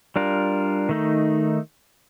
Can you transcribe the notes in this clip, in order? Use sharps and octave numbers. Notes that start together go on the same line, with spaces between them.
G3 D4 F4 A#4
D#3 A3 D#4